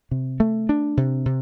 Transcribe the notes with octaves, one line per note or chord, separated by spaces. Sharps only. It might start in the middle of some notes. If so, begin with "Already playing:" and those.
C3
A3
D4
C3
C3